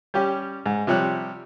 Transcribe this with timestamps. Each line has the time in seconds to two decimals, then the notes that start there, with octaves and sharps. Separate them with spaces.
0.14 G3 C#4 G4
0.66 G#2
0.87 C3 F3 G3 C#5 F#6